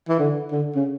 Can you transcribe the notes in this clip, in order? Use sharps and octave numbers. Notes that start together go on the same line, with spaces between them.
E3
D3
D3
C#3